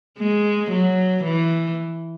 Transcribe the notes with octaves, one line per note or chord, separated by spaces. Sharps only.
G#3
F#3
E3